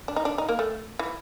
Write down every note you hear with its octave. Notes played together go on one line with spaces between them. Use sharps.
D4
D#4
D4
D#4
A#3
A3
E3